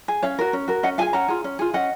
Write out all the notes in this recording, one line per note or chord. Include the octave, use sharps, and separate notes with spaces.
G#4
C#4 C#5 F5
F#4 A#4
C#4
F#4 A#4
C#4 D#5 F#5
F4 G#4 F5 G#5
C#4 F#5 A#5
F4 G#4
C#4
F4 G#4
C#4 D#5 F#5